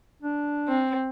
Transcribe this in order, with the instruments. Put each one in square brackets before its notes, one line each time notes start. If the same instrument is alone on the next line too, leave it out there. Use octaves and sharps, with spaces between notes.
[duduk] D4
[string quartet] C4